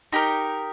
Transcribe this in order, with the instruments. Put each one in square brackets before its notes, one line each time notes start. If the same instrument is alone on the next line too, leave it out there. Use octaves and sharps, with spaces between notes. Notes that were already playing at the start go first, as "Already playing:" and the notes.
[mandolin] D#4 G4 A#4